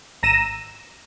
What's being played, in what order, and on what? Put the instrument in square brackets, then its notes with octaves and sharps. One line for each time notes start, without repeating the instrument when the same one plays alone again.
[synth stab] G#1 A#5 E6 A#6 D#7 E7